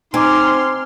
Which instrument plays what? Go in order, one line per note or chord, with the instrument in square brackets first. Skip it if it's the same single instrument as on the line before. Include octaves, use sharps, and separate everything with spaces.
[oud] C4 [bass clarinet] D#4 [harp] G#5 D6 [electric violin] C6 F6